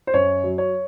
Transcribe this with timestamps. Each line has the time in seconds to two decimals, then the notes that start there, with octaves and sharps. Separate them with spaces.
0.07 C5
0.14 F#2 C#5
0.44 F#3
0.58 C#5